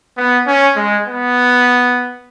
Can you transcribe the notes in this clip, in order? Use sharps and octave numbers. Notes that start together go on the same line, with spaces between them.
B3
C#4
G#3
B3